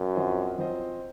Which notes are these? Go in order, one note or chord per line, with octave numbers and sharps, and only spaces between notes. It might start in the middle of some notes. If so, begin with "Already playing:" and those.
Already playing: F#2
F3 C4 F4 C5 D#5
F3 C4 F4 C5 D#5